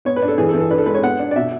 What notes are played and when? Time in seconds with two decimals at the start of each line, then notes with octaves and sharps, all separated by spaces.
0.05 B3 C#5
0.16 B4
0.22 D4
0.28 A4
0.38 E3 G#4
0.49 A4
0.54 E3
0.60 A4
0.71 D4 B4
0.78 A4
0.86 G#3 B4
0.95 C#5
1.02 B3 F#5
1.19 D4
1.31 D5
1.36 B2 E5